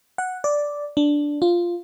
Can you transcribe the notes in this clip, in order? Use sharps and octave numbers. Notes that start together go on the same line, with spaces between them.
F#5
D5
D4
F4